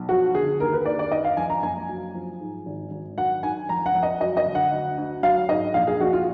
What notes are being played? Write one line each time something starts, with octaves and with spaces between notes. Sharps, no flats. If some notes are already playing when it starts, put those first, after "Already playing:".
Already playing: B1
F3 F#4
D3 G#4
D#2 A#4
B4
D#2 D5
D5
D#3 D#5
F5
F2 G#5
A#5
F#1 G#5
F#3
F3
G#2
G#1
G#1
F#3 F#5
D#3 G#5
F2 A#5
F#5
F2
D#5
F#3 D#5
D#5
D3
F#5
D2
D2
F#3 F5
G#2 D#5
A#1 F5
G#4
A#1 F#4
F4